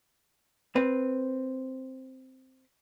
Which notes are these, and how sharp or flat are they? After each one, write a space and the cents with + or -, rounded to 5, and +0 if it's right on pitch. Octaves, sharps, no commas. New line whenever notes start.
C4 +0 B4 +0